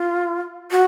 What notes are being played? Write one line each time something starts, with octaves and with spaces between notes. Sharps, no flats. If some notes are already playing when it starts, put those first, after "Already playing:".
Already playing: F4
F#4